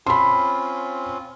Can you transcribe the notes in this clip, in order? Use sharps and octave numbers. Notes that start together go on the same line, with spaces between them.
C4 C#4 F4 B5 C6